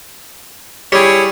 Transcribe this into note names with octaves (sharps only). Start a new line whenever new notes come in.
G3 E4 G#4 C#5